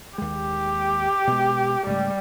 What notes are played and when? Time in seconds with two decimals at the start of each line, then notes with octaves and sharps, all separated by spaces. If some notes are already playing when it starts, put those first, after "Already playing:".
0.18 D#2 G#3 G4
1.27 B2 G#3
1.86 G#2 C#3 G3 A3